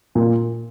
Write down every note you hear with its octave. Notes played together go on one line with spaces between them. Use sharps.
A#2